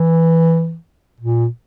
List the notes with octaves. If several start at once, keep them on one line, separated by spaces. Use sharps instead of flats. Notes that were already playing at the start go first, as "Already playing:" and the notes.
Already playing: E3
A#2